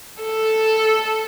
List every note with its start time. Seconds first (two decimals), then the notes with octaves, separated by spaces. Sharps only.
0.23 A4